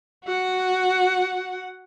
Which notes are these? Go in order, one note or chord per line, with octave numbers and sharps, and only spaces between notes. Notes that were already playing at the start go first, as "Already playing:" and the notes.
F#4 F#5